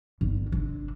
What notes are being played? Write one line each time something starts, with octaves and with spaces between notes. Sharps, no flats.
G1
C3 D4